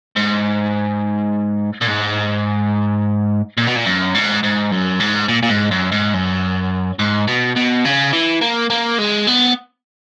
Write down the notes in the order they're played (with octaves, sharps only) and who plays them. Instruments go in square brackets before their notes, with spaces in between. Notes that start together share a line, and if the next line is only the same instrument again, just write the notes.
[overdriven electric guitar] G#2
A#2
G#2
A#2
B2
A#2
F#2
G#2
G#2
F#2
G#2
A#2
A#2
G#2
F#2
G#2
F#2
G#2
B2
B2
C#3
E3
A#3
A#3
G#3
B3